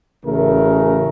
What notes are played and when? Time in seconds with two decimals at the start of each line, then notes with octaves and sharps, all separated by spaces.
0.25 A1 C#3 A3 A#4